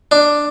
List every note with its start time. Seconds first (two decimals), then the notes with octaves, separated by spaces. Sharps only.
0.11 D4